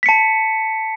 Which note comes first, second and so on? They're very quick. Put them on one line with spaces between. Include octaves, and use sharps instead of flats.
B6 C#7 A5